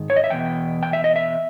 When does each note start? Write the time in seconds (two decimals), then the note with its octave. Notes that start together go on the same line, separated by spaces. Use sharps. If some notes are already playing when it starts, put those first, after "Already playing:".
Already playing: G#2 D#3
0.10 C#5
0.16 D#5
0.24 E5
0.30 E2 B2 G5
0.83 G5
0.93 E5
1.04 D#5
1.16 E5